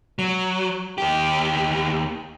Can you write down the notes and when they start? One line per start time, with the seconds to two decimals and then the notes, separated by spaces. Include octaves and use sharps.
0.19 F#3
0.98 D#2 G4